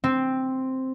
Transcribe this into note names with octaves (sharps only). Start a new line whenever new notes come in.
C4